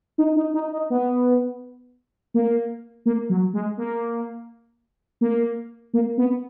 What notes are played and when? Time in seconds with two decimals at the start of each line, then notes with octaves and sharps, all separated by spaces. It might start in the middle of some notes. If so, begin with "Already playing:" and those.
0.18 D#4
0.36 D#4
0.54 D#4
0.72 D#4
0.90 B3
2.34 A#3
3.06 A#3
3.29 F#3
3.53 G#3
3.77 A#3
5.21 A#3
5.94 A#3
6.18 B3